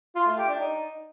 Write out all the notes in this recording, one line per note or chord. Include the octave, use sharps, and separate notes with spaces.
F4
A3
G4
D4
D#4